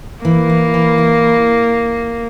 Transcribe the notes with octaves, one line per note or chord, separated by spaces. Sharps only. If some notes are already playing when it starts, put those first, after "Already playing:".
E3 A#3
E4
E3
E4